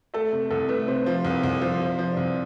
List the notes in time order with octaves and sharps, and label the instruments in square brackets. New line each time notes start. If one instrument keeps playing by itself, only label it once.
[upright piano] A3 [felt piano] A4
[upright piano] C3
[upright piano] C2 [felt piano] A4
[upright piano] A3 [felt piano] B4
[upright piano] C3 [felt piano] C5
[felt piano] B4
[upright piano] F3 [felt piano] C5
[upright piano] C2
C2
[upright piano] F3 [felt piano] C5
[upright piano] C3
[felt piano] C5
[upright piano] F3
[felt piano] D5
[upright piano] C2